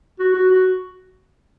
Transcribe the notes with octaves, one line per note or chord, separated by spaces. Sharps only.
F#4
F#4
F#4